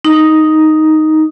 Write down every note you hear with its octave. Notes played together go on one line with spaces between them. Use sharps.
D#4